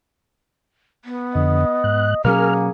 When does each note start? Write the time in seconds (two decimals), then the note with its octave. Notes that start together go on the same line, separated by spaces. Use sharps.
1.05 B3
1.35 F2 D3 D#5
1.84 G#2 F#6
2.25 B2 F#3 A#3 C#4 G#4 A#4 F6